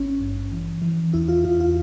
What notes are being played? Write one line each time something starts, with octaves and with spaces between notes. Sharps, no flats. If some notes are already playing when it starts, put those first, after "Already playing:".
Already playing: G#1 C#4
G2
E3
E3
E2 E4
F4
E2 F4
F4